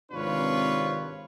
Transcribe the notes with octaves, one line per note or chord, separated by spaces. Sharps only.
G#1 C3 D4 F4 B4 C#5